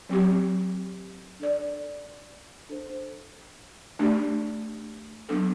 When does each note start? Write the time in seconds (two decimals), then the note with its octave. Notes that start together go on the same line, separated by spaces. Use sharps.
0.09 F#3 C4 G4
1.39 D4 A4 D5
2.69 D4 A4 C5
3.99 A3 D4 G4 D5
5.29 F#3 B3 D4 A4